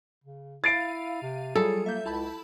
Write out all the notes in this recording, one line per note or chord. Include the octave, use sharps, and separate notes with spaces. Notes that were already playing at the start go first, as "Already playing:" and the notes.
C#3
E4 F5 A6 C7 D7 D#7
C3
F#3 G3 F4 G#4 A4
A#3 E5 G6
C#2 E4 A5 B5